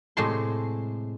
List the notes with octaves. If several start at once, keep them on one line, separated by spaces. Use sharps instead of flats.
A2 C3 G#3 G5 A5 C6